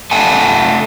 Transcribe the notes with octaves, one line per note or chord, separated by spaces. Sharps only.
A4 E5 F#5 G#5 A5